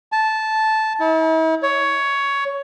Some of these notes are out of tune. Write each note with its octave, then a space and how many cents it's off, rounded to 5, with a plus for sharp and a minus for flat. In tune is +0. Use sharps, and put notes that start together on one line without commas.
A5 -10
E4 -45
C#5 +10